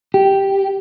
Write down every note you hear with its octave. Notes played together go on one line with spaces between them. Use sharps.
G4